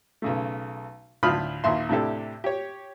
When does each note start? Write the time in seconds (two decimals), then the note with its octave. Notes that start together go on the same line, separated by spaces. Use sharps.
0.22 B1 C#3 A3
1.23 D2 A2 F4 B5 D#6 F6
1.64 A#1 D#2 E4 E5 C6
1.89 A2 C3 D4 E4 G4 A4
2.44 G4 C#5